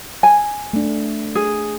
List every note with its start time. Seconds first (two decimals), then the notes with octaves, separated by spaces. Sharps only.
0.23 G#5
0.73 A3 D4
1.35 G#4